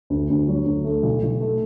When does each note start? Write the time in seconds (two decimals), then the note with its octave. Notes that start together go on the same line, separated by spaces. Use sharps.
0.10 D2
0.30 D2
0.48 F#3
0.66 D2
0.84 A3
1.03 B1
1.22 B1
1.40 A3